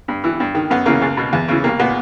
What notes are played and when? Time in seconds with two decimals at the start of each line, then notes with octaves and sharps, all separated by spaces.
0.08 G2
0.24 E3
0.40 G2
0.55 D#3
0.70 F#2 B3
0.86 C#3 E3 A#3
1.02 C#2
1.17 B2
1.33 E2
1.48 C#3 E3
1.64 C2 A#3
1.79 A#2 B3